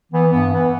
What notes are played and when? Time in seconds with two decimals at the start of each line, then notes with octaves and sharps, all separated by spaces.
0.12 E3 B3
0.32 G2 B3
0.52 E3 B3